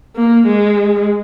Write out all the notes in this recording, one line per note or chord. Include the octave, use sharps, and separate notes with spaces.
A#3
G#3